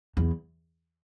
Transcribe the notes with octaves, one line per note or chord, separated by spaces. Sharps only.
E2